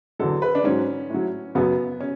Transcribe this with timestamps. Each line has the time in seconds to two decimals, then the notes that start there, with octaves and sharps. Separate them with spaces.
0.19 E2 D3 F#3 A4
0.42 B4
0.55 D4
0.64 G#2 F#3 C#4
1.10 A2 F#3
1.55 F#2 C#3 F#3 B3
2.01 C#4